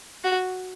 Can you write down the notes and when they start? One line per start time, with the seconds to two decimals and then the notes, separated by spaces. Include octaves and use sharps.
0.24 F#4